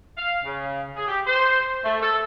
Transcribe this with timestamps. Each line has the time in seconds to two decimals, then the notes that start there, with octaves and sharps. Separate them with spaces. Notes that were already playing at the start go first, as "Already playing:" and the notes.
0.18 F5
0.45 C#3
0.96 G#4
1.08 G4
1.27 C5
1.84 A3
2.02 A4